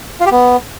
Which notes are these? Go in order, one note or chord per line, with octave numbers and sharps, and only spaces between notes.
F4
G4
B3